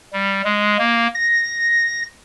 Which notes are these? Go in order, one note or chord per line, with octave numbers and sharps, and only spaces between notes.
G3
G#3
A#3
A#6